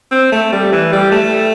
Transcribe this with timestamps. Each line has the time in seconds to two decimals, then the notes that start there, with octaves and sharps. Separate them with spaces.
0.11 C4
0.32 A3
0.52 G3
0.72 E3
0.92 G3
1.12 A3